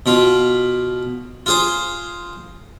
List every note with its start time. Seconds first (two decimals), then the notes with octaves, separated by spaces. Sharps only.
0.06 B2 F4
1.46 F4 G#4 C5